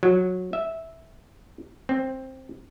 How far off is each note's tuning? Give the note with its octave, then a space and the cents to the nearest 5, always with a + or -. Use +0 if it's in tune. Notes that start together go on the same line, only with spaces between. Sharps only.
F#3 -15
E5 -10
C4 +10